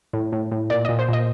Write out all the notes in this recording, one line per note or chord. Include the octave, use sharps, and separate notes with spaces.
A2
A2
A2
A#2 D5
A#2 D#5
C5
A#2 D#5